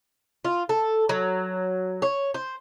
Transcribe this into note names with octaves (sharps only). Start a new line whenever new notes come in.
F4
A4
F#3
C#5
C5